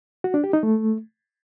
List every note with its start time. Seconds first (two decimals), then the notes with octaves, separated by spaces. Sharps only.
0.24 F#4
0.34 D4
0.44 G4
0.53 D#4
0.63 A3